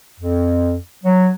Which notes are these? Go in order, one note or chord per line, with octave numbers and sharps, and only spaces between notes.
F2
F#3